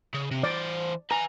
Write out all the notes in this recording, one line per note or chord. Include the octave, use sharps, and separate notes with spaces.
C#3
C3
E3 C5 D5
B4 G#5 A#5